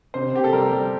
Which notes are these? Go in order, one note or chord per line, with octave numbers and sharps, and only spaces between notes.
C3 C5
C3 G4
A4
G3 A#4
G3